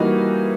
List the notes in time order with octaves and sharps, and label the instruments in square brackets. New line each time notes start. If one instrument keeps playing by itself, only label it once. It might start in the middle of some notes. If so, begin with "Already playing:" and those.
Already playing: [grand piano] E3 G3 A#3 D#4 F#4